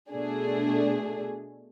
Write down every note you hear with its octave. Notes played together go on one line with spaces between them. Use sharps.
B2 A3 D4 G#4